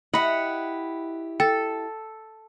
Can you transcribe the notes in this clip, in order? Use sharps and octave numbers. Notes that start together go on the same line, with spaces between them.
E4 G4 D#5 F#5 B5
A4 G5